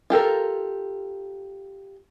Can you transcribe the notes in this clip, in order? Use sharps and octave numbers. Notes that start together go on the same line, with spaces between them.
F4 G4 A4 A#4